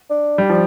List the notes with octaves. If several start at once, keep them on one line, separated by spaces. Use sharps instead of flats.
D4
G3
F3